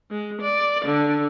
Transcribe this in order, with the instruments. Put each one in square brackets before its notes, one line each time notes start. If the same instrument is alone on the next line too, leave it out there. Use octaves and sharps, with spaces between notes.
[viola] G#3
D5
D3